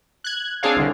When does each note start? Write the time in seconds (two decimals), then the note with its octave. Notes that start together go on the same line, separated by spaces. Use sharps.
0.24 F#6 G#6
0.63 C4 D4 G#4 C#5 F5
0.76 C2 D3